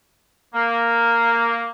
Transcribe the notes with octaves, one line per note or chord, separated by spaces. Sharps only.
A#3